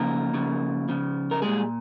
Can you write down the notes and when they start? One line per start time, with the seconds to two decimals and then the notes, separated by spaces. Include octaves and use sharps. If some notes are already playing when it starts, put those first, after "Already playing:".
Already playing: C#3 F3 A#3 A#4
0.34 C#3 F3
0.89 C#3 F3
1.31 A#4
1.42 A#2 G3 G#3 G#4